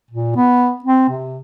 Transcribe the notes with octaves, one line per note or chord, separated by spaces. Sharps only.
A#2
B3
C4
C3